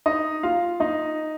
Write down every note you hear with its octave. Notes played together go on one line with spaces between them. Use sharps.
D#4 D#5
F4 F5
D#4 D#5